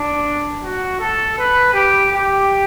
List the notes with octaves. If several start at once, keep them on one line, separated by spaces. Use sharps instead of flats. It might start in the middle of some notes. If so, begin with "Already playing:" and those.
Already playing: D4
F#4
A4
B4
G4
G4